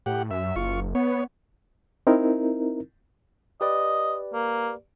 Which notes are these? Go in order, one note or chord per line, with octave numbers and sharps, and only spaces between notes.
A2 G4 F#5
F#2 E5
F#1 F4 C#6
B3 C#5
C4 D#4 E4 A#4
G4 B4 D5 D#5
A#3